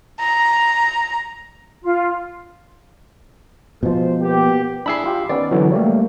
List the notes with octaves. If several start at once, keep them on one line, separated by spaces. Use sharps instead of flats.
A#5
F4
B2 F3 G#3 C5
A#3 B3 G4
D4 E4 G#4 B5 E6 C7
F4 G4
D#3 B3 C#4 D5
D3 E3 F#3
G3 A3 A#3 G4 C#5